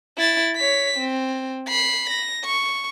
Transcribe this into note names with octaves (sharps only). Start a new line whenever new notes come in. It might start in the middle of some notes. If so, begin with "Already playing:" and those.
E4 A6
C#5 B6
C4
B5 C7
A#6
C#6